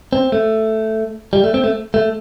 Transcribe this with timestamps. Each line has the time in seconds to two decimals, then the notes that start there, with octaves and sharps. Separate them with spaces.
0.13 C4
0.32 A3
1.33 G3
1.44 A3
1.54 C4
1.64 A3
1.94 A3